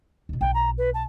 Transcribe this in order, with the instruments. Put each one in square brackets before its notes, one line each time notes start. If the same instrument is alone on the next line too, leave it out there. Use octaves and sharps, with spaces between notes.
[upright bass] D#2 B2
[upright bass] B1 F4 [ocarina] G5
[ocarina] A#5
B4
A5